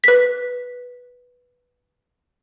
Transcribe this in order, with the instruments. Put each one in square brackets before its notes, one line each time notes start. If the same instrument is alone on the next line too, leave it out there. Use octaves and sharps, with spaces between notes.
[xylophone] B4 B6